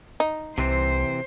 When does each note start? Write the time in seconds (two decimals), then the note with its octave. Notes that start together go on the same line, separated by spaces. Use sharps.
0.20 D#4
0.58 C2 C3 E3 C4 C5